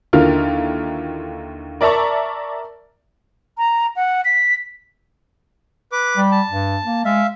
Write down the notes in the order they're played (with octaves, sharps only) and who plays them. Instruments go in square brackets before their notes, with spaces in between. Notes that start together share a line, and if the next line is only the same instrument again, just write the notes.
[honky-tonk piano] D#2 D3 E4 F4 A#4 F6
A#4 D5 E5 A5 A#5 C#6
[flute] A#5
F#5
B6
[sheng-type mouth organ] B4 D6
[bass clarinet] G3
[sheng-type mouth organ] A5
[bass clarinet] G2
A#3
[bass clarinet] G#3 [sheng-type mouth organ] E5 F5